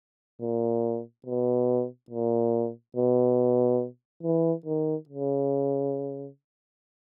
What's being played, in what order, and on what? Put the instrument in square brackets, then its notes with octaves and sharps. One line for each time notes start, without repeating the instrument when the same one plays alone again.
[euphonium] A#2
B2
A#2
B2
E3
D#3
C#3